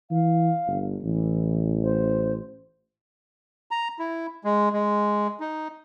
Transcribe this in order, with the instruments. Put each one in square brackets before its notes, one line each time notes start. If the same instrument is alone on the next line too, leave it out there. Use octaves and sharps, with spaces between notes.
[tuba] E3 [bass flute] F5
[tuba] G1
[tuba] A1 [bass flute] E3
[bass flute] C5
[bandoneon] A#5
E4
G#3
G#3
D#4